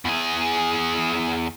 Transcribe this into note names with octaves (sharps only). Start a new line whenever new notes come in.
E2 G#4